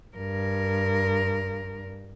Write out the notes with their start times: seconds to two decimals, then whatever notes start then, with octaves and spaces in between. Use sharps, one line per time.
0.17 G2 A#4